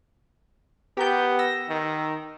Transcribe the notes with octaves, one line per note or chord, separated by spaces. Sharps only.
B3 G4 A#4 G6
E6 A#6
D#3